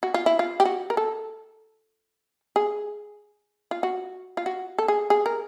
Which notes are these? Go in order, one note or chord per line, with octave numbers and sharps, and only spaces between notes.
F#4
F4
E4
F4
G4
F#4
A#4
A4
G#4
F4
F#4
F4
F#4
A4
G#4
G#4
A#4